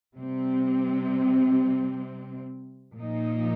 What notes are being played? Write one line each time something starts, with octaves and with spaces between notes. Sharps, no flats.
C3 G3 C4
A#2 F3 A#3 D#4